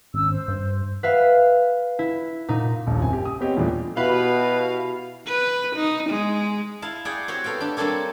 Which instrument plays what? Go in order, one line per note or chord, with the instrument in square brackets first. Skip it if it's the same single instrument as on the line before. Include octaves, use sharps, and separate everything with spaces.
[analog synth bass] G#1 [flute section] C#4 E6
[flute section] C5
[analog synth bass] G2
[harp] B4 E5 F5
E4
A#2 D#4
[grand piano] D#1 A#1
F#1 C4 G#5
G4
D#6
B3 C4 G4 C#5 D#5
E2 A#2 F3 G3 A3 D4
[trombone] B2 [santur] E4 F#4 G4 [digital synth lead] B4 [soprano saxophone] F5
[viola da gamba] B4
D#4
G#3
[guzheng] E4 F5 A5
G#4 D5 F#5 G5
C4 F#4 G4 C#5
B3 A4 F5 G5
D4 G4
G3 A#3 C4 D4 A4 C#5